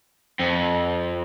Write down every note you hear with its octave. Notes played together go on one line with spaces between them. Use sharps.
F2